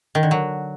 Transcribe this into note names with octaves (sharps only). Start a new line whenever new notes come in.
D#3
D3
F#3